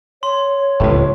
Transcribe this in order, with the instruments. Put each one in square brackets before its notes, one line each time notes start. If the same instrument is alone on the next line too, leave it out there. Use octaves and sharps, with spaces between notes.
[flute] C#5 [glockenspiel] C6
[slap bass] D1 C#2 [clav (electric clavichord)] G1 A2